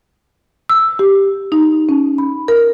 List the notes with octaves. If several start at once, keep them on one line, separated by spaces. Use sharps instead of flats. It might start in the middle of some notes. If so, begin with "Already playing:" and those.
E6
G4
D#4
C#4
B5
A#4